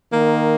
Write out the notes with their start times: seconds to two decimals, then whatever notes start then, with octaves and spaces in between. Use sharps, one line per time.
0.13 D#3 A#3